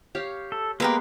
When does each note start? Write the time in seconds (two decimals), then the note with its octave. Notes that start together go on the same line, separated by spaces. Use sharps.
0.15 G4 C#5 F5
0.52 A4
0.80 G#3 A#3 B3 G4 A#4 B4